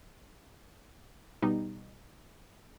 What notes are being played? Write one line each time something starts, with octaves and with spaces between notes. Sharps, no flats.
B2 G3 D#4